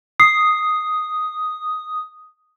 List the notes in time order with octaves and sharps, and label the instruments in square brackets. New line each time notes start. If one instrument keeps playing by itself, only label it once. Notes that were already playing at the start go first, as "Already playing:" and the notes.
[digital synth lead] D#6 [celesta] C7